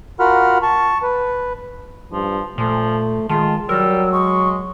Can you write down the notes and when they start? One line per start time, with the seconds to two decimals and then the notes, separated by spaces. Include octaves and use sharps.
0.20 F4 F#4 A#4 F#5 B5 F6
0.62 A5 C#6
1.03 B4
2.12 G2 F3
2.58 A#2 F3 A3
3.29 D#3 G#3 F4 A5
3.69 F#3 G3 A#4 E6
4.12 G#3 C#6